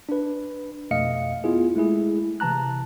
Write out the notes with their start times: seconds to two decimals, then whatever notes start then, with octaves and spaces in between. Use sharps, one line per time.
0.09 D4 B4
0.91 F2 B2 A3 D#5 F5 C#7
1.44 B3 E4 F4 G#4
1.75 G#3 A3 E4 G#4
2.40 C3 E3 A5 A#5 F#6